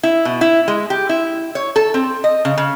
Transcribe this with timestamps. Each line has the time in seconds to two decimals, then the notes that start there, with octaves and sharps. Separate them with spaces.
0.03 E4
0.25 B2
0.41 E4
0.68 G#3
0.90 G4
1.09 E4
1.55 C#5
1.76 A4
1.94 C4
2.24 D#5
2.45 C#3
2.58 C#3